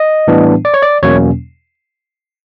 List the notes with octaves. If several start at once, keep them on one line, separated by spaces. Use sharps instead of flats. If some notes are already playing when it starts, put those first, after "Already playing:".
Already playing: D#5
A2 E3 G3 B3 D4
D5
C#5
D5
E2 B2 F#3 A#3 C#4 C#5